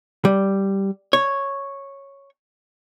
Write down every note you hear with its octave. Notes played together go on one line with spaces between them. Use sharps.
G3
C#5